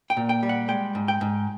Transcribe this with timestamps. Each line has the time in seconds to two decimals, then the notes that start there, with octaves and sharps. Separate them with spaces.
0.10 G5
0.17 A#2
0.29 G5
0.43 G3
0.49 F#5
0.68 G#3 G5
0.95 G#2
1.08 G5
1.21 G#2